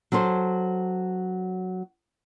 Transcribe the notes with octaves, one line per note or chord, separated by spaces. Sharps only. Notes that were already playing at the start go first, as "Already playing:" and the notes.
F#3 C#4 A4 C5